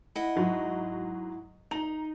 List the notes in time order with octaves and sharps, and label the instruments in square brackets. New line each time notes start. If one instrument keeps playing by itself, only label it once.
[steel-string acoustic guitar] E4 D#5 F#5
[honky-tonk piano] G#2 F#3
[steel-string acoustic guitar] D#4 [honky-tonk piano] A#5 F7